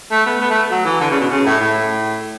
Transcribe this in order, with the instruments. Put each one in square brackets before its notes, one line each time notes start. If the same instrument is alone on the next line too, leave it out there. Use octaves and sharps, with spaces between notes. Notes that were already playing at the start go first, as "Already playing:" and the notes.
[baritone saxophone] A3
B3
B3
A3
F#3
E3
D3
C#3
B2
C#3
A2
A2